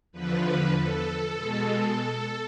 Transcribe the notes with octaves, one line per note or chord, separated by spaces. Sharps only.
E2 D3 F3 B4
B4
A4
B2 G#3